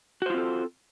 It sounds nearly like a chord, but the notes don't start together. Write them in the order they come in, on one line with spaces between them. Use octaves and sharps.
F#4 C5 F4 C4 A4